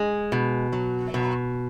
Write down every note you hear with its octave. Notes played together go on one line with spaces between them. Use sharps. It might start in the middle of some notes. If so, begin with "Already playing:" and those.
Already playing: G#3
B2
F#3
B2